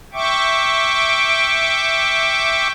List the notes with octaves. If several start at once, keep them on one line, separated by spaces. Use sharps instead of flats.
E5 G5 C#6 D6